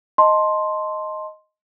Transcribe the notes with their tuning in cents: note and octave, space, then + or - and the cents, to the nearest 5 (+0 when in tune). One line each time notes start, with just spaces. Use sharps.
D#5 +0 A5 +0 C6 +5